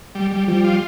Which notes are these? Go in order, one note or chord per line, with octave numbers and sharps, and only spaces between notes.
G3
G3
F3 G3
F4